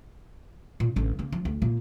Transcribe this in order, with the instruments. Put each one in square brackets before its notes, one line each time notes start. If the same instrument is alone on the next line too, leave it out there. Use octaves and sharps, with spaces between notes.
[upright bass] A#2
A1 D3
C#3 A#3
F3
D2
A#2 A#3